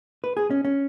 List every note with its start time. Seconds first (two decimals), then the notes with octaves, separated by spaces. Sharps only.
0.24 B4
0.37 G#4
0.51 C#4
0.65 C#4